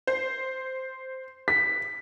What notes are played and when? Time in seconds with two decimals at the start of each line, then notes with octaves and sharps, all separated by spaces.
0.07 C5
1.48 B6